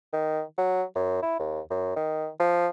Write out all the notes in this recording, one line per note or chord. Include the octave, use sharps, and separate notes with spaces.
D#3
F#3
F#2
E4
D#2
F#2
D#3
F3